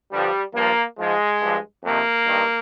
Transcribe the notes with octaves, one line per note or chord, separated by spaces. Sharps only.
G2 D3 F3 G3
G2 F3 A#3
G#2 F3 G#3
G2 F3
F2 C3 D#3 A#3
G2 D#3